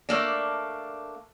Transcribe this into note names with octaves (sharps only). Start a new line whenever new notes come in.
A3 A#3 D4